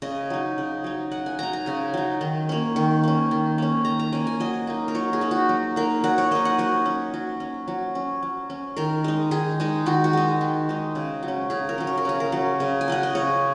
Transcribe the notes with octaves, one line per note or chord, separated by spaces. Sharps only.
C#3 D#5
F#3 D#4
C#3
F#3 D#4
C#3 F#5
G#5
F#3 D#4 A#5
A#5
C#3 G#5
F#3 D#4
D#3
A#3 C#4
D#3
A#3 C#4
D#3
A#3 C#4
D#3 A#5
A#5
A#3 C#4 G#5
G#5
F#3 D#5
A#3 D#4
A#4
F#3 C#5
G#4
A#3 D#4
F#4
F#3
A#3 D#4 A#4
F#3 F#5
C#5
A#3 D#4 D#5
F#5
F#3 C#5
C#4
F#3
C#4
F#3
C#4
F#3
C#4
D#3 A#4
G#3 D#4
D#3 G#4
G#3 D#4
D#3 F#4
F#4
G#3 D#4
D#3
G#3 D#4
C#3
F#3
C#4
C#3 G#4
A#4
F#3 C#4
C#5
A#4
C#3 G#4
A#4
F#3 C#4
C#3
G#5
F#3 C#4 F#5
D#5
C#3 C#5